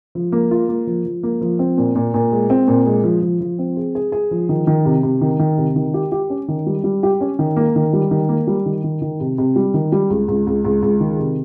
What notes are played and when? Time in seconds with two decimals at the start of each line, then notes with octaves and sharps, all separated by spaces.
0.15 F3
0.32 A#3
0.51 F4
0.69 A#3
0.87 F3
1.06 F3
1.23 A#3
1.41 F3
1.59 C4
1.78 A#2
1.95 A#2
2.14 A#2
2.32 G#3
2.50 C4
2.68 A#2
2.86 G#3
3.04 F3
3.23 F3
3.41 F3
3.59 C4
3.77 G#4
3.95 G#4
4.12 G#4
4.31 F3
4.49 D#3
4.67 D#3
4.85 C3
5.03 C3
5.21 D#3
5.39 D#3
5.58 C3
5.76 D#3
5.94 G4
6.12 G4
6.30 C#4
6.48 D#3
6.66 G3
6.84 G3
7.03 G4
7.21 C#4
7.39 D#3
7.56 A#3
7.76 D#3
7.93 G3
8.11 D#3
8.29 A#3
8.47 G3
8.66 D#3
8.84 D#3
9.02 D#3
9.20 C3
9.38 C3
9.56 G3
9.74 D#3
9.92 G3
10.10 C#2
10.28 C#2
10.47 C#2
10.65 C#2
10.83 C#2
11.00 D#3
11.19 C3